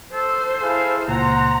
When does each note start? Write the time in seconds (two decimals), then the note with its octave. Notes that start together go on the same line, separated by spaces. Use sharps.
0.14 A4 C5
0.60 E4 G#4 F5
1.08 C#2 A#2 C5 F#5 A#5